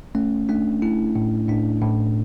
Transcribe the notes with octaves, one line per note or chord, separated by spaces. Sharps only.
A3 C#4
A3 D4
A3 E4
A2
A2 D4
A2